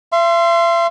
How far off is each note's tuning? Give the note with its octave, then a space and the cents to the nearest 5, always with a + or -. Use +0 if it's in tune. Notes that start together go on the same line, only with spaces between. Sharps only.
E5 +45 C6 +0